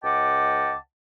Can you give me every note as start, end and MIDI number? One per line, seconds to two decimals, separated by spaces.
0.04 0.76 37
0.04 0.76 75
0.04 0.76 78
0.04 0.76 79
0.04 0.76 81
0.04 0.76 86